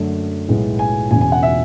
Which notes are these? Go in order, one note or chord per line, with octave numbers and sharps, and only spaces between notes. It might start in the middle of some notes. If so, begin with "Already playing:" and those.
Already playing: F#2 D3 F#3 A3
B1 A2 G#3 B3
G#5
E1 E2 C#3 G#5
G#5
F#5
E5